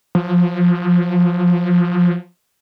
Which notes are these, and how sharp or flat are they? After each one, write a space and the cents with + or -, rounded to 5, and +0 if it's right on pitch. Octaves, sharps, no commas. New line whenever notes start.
F3 +15